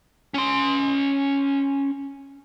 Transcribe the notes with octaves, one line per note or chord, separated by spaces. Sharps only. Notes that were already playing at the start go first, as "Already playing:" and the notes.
C#4 C6